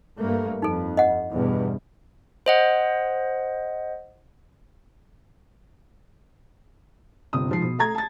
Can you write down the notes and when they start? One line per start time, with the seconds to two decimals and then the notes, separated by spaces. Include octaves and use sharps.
0.18 G2 A3 A#3
0.62 F2 D#4 A4
0.97 D#5 F#5
1.30 E2 G2 B2
2.46 C5 D#5 F#5
7.33 G1 C3 D#6
7.48 G#2 F3 C7
7.62 B2
7.79 A3 A#5 G#6
7.95 A5 A6